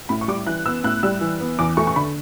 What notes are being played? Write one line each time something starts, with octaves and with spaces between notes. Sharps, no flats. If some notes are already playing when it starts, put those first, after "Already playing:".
A2 B5
C#6
G3 D6
E3 F#6
B3 E6
A2 F#6
G3 E6
E3
B3
E2 D6
A3 C#6
C#6
D3 B5